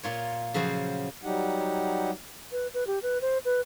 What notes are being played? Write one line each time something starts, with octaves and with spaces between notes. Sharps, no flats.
A#2 F4 C#5
C#3 F3 F#3 F#4 C5
F#3 G3 D#4 G4 F#5
B4
B4
G4
B4
C5
B4